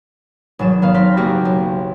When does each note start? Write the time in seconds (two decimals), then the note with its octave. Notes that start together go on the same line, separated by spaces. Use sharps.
0.59 G#1 B2 F#3 E7
0.82 D#3 B3 F5
0.94 B3 C4 C5 F5 B6
1.17 F#1 G#3 A#3 F#4 G4 A#6
1.45 B1